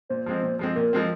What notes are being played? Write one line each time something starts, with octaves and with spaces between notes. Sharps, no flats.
A#2 C5
F3 G#3 C4
A#2
F3 G#3 C4
A#2 A#4
F3 G#3 C4